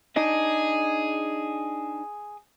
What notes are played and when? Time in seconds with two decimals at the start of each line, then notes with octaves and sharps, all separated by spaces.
0.16 D4 D#4 G#4 D#5